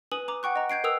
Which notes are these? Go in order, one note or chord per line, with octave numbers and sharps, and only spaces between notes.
B4 G#5 D#6 F#7
A#5 D6
F#5 G5 C#6 F#6
D#5 A#5
G6 G#6 C7 D7
A#4 B4 G5 D#6 E6 F7